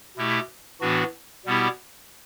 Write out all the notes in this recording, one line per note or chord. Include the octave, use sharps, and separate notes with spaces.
B2 A3 E4 G4
A2 E3 B3 D4 F#4
B2 G3 B3 E4 G4